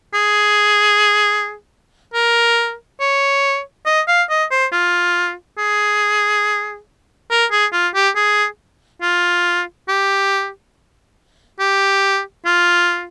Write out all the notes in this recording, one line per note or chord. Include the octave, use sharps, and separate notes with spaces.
G#4
A#4
C#5
D#5
F5
D#5
C5
F4
G#4
A#4
G#4
F4
G4
G#4
F4
G4
G4
F4